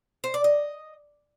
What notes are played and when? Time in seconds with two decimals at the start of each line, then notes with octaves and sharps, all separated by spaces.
0.24 C5
0.34 D5
0.44 D#5